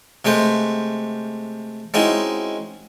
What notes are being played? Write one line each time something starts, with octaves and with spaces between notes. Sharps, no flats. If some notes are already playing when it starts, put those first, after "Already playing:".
C3 G#3 A3 B4 C5
G#3 C4 C#4 D#4 E4 F#4